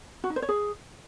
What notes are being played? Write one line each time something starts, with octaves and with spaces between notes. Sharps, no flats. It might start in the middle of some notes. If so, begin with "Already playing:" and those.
F#4
D#4
C5
C#5
G#4